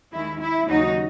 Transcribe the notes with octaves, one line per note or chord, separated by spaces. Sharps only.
D#2 D#3 G#3 E4
E4
D#2 C#3 F#3 C#4 D#4 F#4